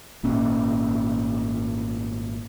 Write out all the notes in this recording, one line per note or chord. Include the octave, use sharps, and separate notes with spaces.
G#1 A#2 C#4